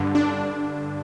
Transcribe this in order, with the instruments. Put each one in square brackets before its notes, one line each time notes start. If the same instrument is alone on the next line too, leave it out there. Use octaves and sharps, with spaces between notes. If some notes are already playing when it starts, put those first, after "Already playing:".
Already playing: [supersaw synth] G2 D3
D4